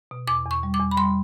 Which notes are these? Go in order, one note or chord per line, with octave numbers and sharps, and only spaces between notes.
B2
E2 D6
E2 C#6
G3
D6
E2
B5
G3 C6